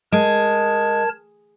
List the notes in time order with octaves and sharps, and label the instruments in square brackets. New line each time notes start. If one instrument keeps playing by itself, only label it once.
[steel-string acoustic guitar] G#3 [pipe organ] A#4 A5 G#6